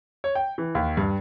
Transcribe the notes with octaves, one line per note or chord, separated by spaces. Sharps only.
C#5
G5
E3
D#2
G2